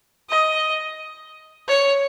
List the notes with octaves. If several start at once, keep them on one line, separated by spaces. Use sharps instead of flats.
D#5
C#5